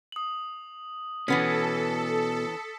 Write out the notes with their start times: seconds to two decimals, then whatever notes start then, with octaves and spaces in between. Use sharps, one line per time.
0.12 D#6 F#7
1.28 B2 E3 B3 C#4 A4 B6 C#7